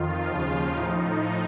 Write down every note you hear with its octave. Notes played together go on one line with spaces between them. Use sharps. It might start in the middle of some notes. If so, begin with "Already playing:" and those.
Already playing: F2 D#3 F4
D#2 C#3 F3 F4
A2 F3 D#4